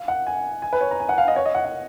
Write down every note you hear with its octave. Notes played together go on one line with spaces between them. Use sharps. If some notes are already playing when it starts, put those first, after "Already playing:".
Already playing: F5
F#5
G#5
G#5
B4
C#5
A#5
G#5
F#5
F5
D#5
C#5
D#5
F#5
F#5